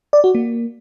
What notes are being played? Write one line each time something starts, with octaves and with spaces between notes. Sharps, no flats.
D5
F#4
A#3